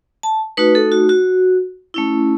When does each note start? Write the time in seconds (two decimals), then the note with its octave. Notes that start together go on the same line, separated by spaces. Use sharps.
0.23 A5
0.57 A3 D#4 F#4 B4
0.75 A4
0.92 F#4
1.09 F#4
1.94 A3 C#4 E4